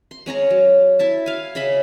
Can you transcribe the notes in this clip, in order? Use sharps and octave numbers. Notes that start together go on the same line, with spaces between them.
C6
G#3 C#4 C#5 A#5
F#3
E4 E5 A5
F5 G#5
C#3 D#5 E5 B5